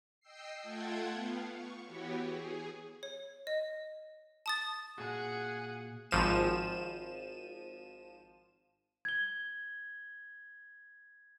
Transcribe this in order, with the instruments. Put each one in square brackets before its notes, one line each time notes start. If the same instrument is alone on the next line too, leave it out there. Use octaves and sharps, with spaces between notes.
[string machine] D#5 G5 E6 C7
A3 F4 F#5 G5 A5 G#6
B3 F5
C#6
E3 B3 E4 F#4 G4 C#5
G#4
[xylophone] C#5
D#5
A5 D#6 A6
[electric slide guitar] A#2 F#4 [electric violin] G#4 F#5
[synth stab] G#1 F3 D#7 E7
[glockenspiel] G#6 G7